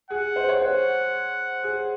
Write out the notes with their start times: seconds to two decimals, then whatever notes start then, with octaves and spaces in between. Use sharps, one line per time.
0.10 G#4 F#5
0.36 C5
0.49 C#5
0.61 C5 F#5
1.63 G#4